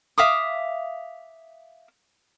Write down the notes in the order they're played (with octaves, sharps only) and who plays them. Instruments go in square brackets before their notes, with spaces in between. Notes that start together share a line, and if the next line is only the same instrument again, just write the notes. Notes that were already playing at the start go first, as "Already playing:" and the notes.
[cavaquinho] E5 F5 D6 D#6